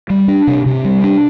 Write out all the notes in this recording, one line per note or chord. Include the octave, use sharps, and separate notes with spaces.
G3
D4
C3
C3
G3
D4